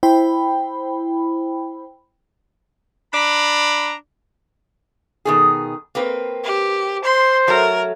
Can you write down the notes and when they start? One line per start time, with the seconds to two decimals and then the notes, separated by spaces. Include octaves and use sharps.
0.03 E4 C5 G5 B5
3.13 D4 D5 A#5 B5
5.25 B2 D#3 G#4
5.95 A#3 C4 B4
6.44 G4
7.04 C5 C6
7.47 F#3 A3 A#4